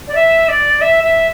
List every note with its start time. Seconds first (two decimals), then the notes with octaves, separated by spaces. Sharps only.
0.08 D5
0.15 E5
0.49 D5
0.81 E5
1.03 E5